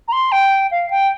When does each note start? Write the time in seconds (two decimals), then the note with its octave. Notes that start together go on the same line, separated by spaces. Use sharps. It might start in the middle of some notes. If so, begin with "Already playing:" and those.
0.08 A#5
0.12 C6
0.32 G5
0.71 F5
0.90 G5